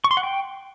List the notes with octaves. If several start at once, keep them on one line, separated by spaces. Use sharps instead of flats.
C#6
C6
F#5
G5